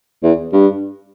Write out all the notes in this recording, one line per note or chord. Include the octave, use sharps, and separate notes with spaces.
E2
G2